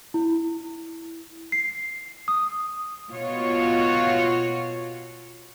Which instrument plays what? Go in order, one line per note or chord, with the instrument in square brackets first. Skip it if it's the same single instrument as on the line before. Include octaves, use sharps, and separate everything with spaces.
[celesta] E4
C7
D#6
[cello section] B2 F4 F#4 C#5